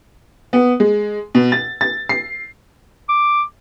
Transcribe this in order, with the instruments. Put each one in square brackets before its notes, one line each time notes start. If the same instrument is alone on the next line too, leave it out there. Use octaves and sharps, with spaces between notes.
[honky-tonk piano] B3
G#3
B2
A6
A6
C7
[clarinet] D6